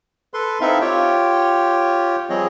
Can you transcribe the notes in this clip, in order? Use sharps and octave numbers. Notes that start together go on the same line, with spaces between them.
A4 B4 C6
C4 D#4 E4 A4 E5 F5
F4 G4 C#5 G5
F3 G3 C4 G#4 C#5 D#5